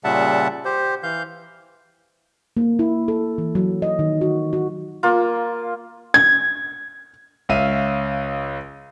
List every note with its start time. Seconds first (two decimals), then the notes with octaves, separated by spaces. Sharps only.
0.04 A#2 C#3 G3 E5 F#5 A5
0.65 G4 C5
1.03 E3 F5 G6
2.57 A#3
2.79 E4
3.08 A4
3.38 E3
3.55 F#3
3.82 D#5
3.99 D#3
4.21 F#4
4.53 F#4
5.03 A#3 F4
6.14 G#6
7.49 C#2 C#4 E5 F5 D#7